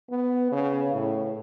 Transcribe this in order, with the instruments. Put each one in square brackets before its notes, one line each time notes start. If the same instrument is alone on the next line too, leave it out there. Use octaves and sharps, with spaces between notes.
[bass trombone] B3
C#3
A2